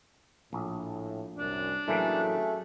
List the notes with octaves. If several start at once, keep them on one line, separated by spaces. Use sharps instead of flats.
A#1 A2
C2 F#2 D4
A2 E3 F#3 A3 A#3 C#4 G#4